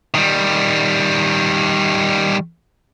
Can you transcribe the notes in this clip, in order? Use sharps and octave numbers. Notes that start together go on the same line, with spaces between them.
D#3 G3